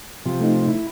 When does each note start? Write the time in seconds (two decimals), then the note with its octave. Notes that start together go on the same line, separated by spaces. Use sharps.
0.26 C3 F3
0.40 A3 D#4
0.68 E4